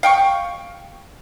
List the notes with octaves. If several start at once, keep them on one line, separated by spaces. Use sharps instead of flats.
F5 G5 C#6